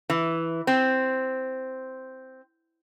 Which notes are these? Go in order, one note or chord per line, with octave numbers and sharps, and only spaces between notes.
E3
C4